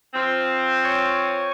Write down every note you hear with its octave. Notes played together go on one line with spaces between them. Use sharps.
F3 C4
C#5 G#5 C#6